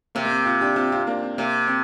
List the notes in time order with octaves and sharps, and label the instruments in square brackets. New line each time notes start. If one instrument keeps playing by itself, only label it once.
[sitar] C3 [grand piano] A#3
[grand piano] A#3
C4
C4 F4
D4 G4
C4 F4
C4 F4
A#3 D4
C4
[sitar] C3 [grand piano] A#3
[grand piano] C4